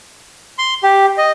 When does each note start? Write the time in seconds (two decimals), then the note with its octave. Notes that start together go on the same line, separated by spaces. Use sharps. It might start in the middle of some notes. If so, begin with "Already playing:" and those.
0.58 C6
0.83 G4
1.18 D#5